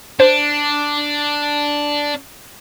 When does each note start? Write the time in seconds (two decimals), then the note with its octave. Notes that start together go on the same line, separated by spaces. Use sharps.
0.20 D4 C5